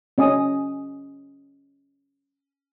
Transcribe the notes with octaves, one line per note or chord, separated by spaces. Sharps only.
C#4 D#5 G#5 D#6